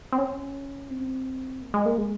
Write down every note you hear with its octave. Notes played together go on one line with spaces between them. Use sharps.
C4
C#4
C4
A#3
G#3
A#3
G#3